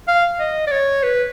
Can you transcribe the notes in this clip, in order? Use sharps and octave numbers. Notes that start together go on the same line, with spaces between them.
F5
D#5
D5
C#5
B4